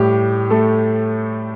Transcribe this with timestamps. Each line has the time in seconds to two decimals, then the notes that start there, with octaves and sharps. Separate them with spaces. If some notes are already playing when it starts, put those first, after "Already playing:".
Already playing: A2 G3 G4
0.50 A3 A4